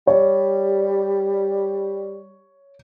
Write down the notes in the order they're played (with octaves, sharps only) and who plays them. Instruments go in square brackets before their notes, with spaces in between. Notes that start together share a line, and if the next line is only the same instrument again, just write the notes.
[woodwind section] G3 [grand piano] C#5